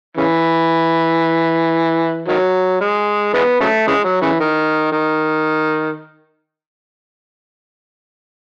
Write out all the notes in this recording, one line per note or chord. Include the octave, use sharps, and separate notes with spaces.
C#3 E3
D#3 F#3
G#3
E3 G#3 B3
C#3 F#3 A3
C#3 E3 G#3
F#3
C#3 E3
D#3
D#3